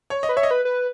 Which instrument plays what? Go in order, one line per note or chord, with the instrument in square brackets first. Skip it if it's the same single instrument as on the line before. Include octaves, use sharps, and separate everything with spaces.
[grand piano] C#5
D#5
[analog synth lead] B4
[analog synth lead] C#5 [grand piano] E5
[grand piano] D#5
[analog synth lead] B4
B4